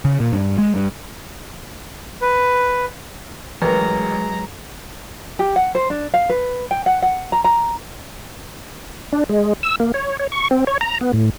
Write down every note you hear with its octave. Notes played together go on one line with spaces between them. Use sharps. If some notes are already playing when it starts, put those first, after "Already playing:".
C#3
A#2
G2
G#3
G2
B4
A1 F#3 G#3 A#4 B4 A#5
G4
F#5
C5
D4
F5
B4
G5
F#5
F#5
A#5
A#5
D4
G#3
E6
A#3
C#5
C#5
C#6
C4
C#5
A#5
B3
A2